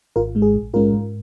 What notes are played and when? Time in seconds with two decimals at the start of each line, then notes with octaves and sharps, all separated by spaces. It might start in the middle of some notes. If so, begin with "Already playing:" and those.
0.16 G#1 F4 A#4
0.35 G#2 G#3
0.42 G#4
0.54 A#1
0.74 G#2 G#3 C#4 F4 A#4
0.93 G#2